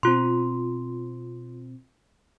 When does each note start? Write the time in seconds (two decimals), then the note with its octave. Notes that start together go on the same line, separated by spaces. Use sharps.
0.03 B2 C4 F4 C6